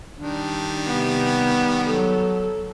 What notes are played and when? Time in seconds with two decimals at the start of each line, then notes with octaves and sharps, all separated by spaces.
0.19 D#3 G3 D4
0.87 C3 B3
1.86 F#3 A4